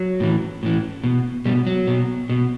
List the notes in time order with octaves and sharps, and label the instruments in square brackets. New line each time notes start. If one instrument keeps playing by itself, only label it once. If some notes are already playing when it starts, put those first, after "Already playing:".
Already playing: [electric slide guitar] F#3
A2 E3
A2 E3
B2
B2 G3
F#3
B2
B2